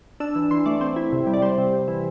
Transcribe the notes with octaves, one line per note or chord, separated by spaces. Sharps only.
D4 E6
E3 E6
E3 C6
A3 D5
C4 C5
E4
C3
G3
D5
G3 C5
C3
C3
E3